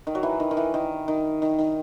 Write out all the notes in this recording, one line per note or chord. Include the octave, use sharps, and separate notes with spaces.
D#3
F#3
E3
D#3
D#3
E3
D#3
D#3
D#3
D#3